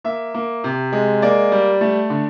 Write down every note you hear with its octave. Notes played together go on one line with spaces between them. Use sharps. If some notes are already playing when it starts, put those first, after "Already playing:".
A#3 E5
A#3
C3
G#3
A#3 D5
G3
A3
D3